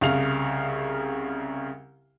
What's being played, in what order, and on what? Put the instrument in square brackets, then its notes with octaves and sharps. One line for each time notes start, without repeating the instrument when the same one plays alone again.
[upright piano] C2 C#3 F5 F7